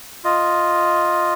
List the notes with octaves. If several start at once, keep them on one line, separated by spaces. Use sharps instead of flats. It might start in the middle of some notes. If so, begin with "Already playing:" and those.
F4 D#5